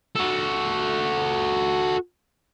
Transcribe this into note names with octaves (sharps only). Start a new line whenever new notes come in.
F#4 A4